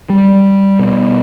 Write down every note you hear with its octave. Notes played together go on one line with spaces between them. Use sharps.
G3
B2